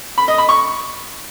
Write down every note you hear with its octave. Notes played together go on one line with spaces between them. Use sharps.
B5
D#5
B5
C#6